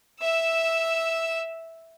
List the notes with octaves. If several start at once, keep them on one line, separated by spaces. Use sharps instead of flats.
E5 E6